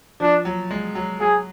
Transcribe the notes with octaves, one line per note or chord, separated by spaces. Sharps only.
F3 D4
F#3
G#3
F#3
F#3 G#4